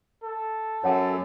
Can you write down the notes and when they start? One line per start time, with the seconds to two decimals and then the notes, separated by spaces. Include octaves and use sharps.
0.24 A4
0.84 F#2 C#5 F#5 A5